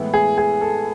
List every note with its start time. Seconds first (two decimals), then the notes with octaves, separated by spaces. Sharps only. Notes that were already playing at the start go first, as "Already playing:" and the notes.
Already playing: A2 E3 G#3 B3 E4
0.14 G#4
0.38 G#4
0.61 A4